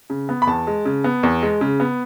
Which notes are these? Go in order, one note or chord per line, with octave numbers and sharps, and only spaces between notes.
C#3
B3
B5
E2 A5
G#3
C#3
B3
E2
G#3
C#3
B3